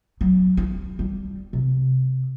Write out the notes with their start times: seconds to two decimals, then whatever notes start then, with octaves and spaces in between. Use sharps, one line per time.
0.21 F#3
0.57 E4
0.99 G3
1.53 C3